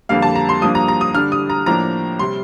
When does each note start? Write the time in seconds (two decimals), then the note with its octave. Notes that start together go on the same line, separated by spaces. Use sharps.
0.09 F2 D3 G3 A#3 F5
0.22 A5
0.35 A#5
0.49 C6
0.62 G2 F3 A#3 D4 D#6
0.75 A#5
0.88 A#5
1.01 D#6
1.14 D3 G3 D4 F6
1.32 D#6
1.50 A#5
1.66 A2 F3 A#3 D4 A#5
2.19 C3 G3 C6